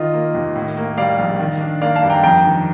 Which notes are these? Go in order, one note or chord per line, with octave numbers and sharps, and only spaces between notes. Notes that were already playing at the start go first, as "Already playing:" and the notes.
Already playing: D#3 F4 D#5
A#3
D#2
A2
A#3
G3 D5 F5
A#1
D#3
D4
A#3 D5 F5
F5 A5
G2
G5 A#5
F2 G5 A#5
D#3